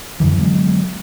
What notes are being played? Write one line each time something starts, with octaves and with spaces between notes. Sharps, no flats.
F#2 D3 E3 F3
D3 F#3 G#3 B3